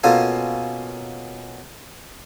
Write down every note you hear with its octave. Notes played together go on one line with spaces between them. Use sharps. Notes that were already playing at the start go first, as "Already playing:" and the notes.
B2 A#3 C#4 F4 A4 G#5